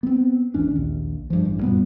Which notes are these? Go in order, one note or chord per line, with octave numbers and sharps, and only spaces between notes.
B3 C4
G#1 E2 C#4 D4
A#1 D#2
G2 F3
A1 G2
F#2 A#2 G3 B3